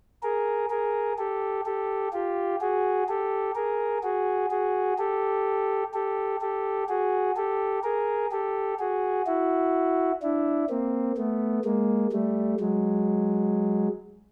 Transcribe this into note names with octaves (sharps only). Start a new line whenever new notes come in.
G#4 A#4
G#4 A#4
G4 A4
G4 A4
F4 G4
F#4 G#4
G4 A4
G#4 A#4
F#4 G#4
F#4 G#4
G4 A4
G4 A4
G4 A4
F#4 G#4
G4 A4
G#4 A#4
G4 A4
F#4 G#4
E4 F#4
D4 E4
A#3 C4
A3 B3
G#3 A#3
G3 A3
F#3 G#3